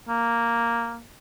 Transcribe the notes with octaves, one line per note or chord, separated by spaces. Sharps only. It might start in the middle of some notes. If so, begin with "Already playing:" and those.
A#3